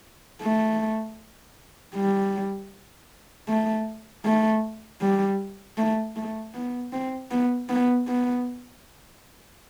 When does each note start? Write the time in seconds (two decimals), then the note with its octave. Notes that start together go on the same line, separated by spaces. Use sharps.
0.42 A3
1.95 G3
3.49 A3
4.25 A3
5.01 G3
5.78 A3
6.16 A3
6.54 B3
6.93 C4
7.31 B3
7.69 B3
8.08 B3